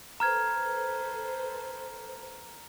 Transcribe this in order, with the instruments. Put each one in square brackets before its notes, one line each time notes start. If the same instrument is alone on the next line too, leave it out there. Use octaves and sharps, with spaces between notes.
[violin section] A4 B4 C5 [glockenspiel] A#5 F6 G#6